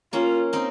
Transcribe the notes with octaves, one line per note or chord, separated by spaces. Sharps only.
A#3 C#4 F4
C4 D#4